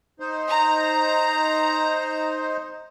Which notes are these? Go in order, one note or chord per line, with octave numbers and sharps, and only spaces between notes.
D#4 C5
A#5